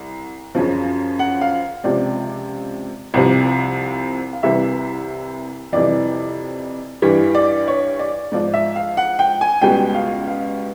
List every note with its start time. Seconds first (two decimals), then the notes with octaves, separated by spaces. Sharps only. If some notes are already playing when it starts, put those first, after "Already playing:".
Already playing: C2
0.55 F#2 C#3 F3
1.19 F#5
1.41 F5
1.84 C#2 C3 F3 D5
3.14 C2 C3 F3
4.33 F5
4.43 C2 C3 E3 G3 E5
5.73 F2 C3 E3 G3 D5
7.02 G2 E3 G3
7.35 D5
7.68 C#5
7.99 D5
8.32 G#2 F3 D5
8.54 E5
8.76 F5
8.97 F#5
9.19 G5
9.41 G#5
9.62 C#2 B2 G3 G5
9.94 F5
10.27 F5